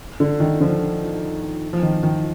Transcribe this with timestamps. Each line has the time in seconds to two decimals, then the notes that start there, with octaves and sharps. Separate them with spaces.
0.20 D3
0.40 D#3
0.60 D3 F3
1.73 F3
1.83 D#3
2.03 D#3